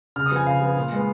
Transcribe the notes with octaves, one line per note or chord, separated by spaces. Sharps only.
C#3 F6
D#6
F3 B3 G#5
C#3 F5
F3 B3
A#2
G#3 B3